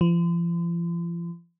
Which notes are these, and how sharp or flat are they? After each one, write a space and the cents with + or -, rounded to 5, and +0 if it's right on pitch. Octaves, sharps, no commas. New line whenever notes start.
F3 -40